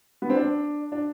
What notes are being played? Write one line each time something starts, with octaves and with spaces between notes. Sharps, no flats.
B3
C4
D4
D4